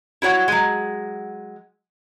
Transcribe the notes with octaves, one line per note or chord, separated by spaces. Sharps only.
E4 F#4 C#5 F#5
F#3 G#3